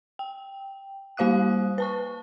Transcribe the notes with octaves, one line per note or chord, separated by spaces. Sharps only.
G5
G3 A#3 C5 F5 D#6 F#6
B4 A5 C#6